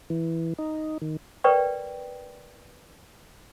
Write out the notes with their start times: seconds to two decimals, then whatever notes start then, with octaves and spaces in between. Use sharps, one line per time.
0.10 E3
0.58 D#4
1.02 D#3
1.44 A#4 B4 D5 G5 C#6